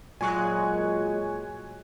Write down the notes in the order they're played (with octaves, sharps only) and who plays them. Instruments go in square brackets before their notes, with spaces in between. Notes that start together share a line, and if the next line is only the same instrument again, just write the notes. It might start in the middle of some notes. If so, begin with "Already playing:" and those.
[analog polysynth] A#2 F#3 G#3 [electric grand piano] G#5 C#6 F#6